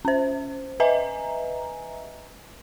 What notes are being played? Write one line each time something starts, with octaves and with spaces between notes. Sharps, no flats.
C#4 C5
B4 D#5 E5 G#5 A#5